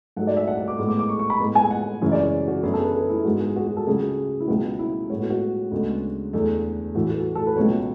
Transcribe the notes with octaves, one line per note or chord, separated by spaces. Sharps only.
G#2 F#3 A3 F#5
D5
E5
F#5
F#5
D6
A2 G#3 B3 D6
D6
D6
C#6
C#6
B5
A2 G#3 B3
G#5
F#5
F#2 C#3 E3 G#3 E5
D5
C#5
F#4
F#2 D3 F#3 B3 G#4
A4
B4
G#4
E4
G#2 G#3 B3 F#4
G#4
F#4
F#4
A4
C#2 C#3 F#3 G#4
E4
C#2 B2 F#3 B3 F#4
E4
A2 G#3 B3 C#5
F#4
F#4
D2 C#3 G#3 B3
E2 D3 A3
A2 E3 A3 F#4
F#4
A4
B4
C#2 B2 F#3 B3 C#5